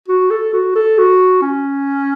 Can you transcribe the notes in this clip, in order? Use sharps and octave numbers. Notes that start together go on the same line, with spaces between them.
F#4
A4
F#4
A4
F#4
C#4